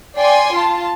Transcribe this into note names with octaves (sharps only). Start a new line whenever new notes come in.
D5 G5 G#5 C6
F4 A5